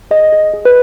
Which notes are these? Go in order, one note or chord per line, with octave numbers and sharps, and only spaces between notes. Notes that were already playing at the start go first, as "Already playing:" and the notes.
G#4 D#5
G#4
G#4
B4